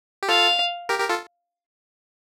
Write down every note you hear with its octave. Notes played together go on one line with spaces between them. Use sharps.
G4
F4 A4 F5
G4 A#4
G4 A#4
F4 A4